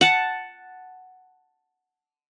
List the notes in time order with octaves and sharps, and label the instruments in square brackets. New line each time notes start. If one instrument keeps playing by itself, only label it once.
[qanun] F#5 A5